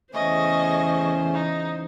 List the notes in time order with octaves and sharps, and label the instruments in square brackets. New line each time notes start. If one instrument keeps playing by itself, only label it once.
[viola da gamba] E2 C#3 C5 [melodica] A3 C#4 [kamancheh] D#5 C#6
[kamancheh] D#4